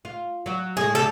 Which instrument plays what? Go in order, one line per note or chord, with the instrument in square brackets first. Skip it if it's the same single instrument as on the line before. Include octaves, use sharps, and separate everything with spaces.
[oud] F4
F#3 F#4
[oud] A2 G#3 [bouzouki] G#4
[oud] D2 A3 G4 [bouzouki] A4